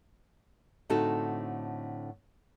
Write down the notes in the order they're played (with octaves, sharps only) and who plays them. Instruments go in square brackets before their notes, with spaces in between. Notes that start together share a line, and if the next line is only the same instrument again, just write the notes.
[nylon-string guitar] A2 D3 C4 D#4 F#4 A4